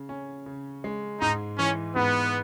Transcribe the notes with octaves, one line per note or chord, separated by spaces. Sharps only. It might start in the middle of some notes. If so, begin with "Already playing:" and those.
Already playing: C#3
C#4
C#3
G#3
G#2 D#4
E3 C#4
G#2 B3